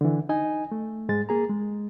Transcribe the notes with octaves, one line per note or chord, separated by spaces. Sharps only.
D3 E3
D#4 D#5 G#5
A3
G#2 G#3 A6
A#3 G#4 A#5
G#3